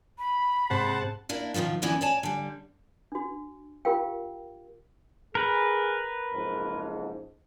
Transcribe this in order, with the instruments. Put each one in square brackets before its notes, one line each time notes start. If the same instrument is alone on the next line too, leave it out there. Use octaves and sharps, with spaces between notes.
[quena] B5
[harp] G#2 [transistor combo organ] C3 F#5 A5 [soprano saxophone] C5
[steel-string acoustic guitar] A#3 D4 E4
B2 D#3 F3 F#3 F4
F#2 D3 E3 B3 D4 E4
C#5 D5 G#5 A5
D3 G3
[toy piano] D4 F#4
F4 G4 A#4 F5 G5
[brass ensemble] G#4 [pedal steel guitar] A#4 B4
[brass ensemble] F#1 F2 G#2